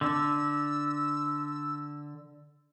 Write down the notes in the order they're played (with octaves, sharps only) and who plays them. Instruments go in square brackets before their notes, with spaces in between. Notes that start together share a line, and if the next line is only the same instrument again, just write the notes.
[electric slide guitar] D3 [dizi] E6